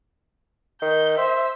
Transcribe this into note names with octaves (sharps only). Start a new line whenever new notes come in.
D#3 G6
C5 E5